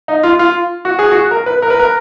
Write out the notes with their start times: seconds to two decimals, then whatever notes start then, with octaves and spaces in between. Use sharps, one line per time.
0.08 D#4
0.23 F4
0.39 F4
0.85 F#4
0.99 G#4
1.12 F#4
1.31 A#4
1.46 B4
1.62 A#4
1.70 B4
1.79 A#4